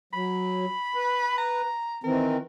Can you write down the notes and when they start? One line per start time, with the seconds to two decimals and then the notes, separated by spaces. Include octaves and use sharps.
0.13 F#3 B5
0.95 B4
1.38 A#5
2.04 D#3 E3 C4 A#4